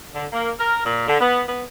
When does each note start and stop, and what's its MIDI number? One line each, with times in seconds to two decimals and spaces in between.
0.15 0.25 50
0.33 0.50 58
0.59 0.83 70
0.84 1.07 46
1.08 1.20 50
1.20 1.41 59
1.47 1.62 59